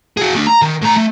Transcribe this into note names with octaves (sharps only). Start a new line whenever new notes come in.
F#4 G#4
A3 D4
A#5
D#3
A2 A#5
A3